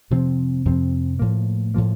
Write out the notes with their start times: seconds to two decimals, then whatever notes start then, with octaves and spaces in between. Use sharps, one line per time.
0.10 F2 C3 F3 C4
0.65 F2 C3 F3 C4
1.19 A2 F3 A#3
1.74 A2 F3 A#3